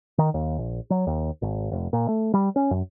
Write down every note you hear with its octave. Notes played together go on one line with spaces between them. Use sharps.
D#3
D#2
A#1
F#3
D#2
G#1
F1
A#2
A3
G3
C#4
F#2